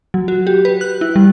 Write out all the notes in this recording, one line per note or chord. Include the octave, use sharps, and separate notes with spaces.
F#3
F#4
G4
B4
F#6
E4
G3